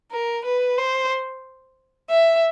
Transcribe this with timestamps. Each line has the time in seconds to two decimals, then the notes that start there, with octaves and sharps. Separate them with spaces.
0.11 A#4
0.46 B4
0.78 C5
2.10 E5